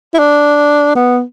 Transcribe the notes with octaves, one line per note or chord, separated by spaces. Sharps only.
E4
D4
B3